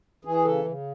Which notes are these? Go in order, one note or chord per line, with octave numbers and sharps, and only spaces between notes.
E3 G#4
C#3 A4
C#3